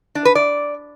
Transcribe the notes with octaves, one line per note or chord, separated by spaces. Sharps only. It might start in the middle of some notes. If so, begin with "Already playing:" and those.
D4
B4
D5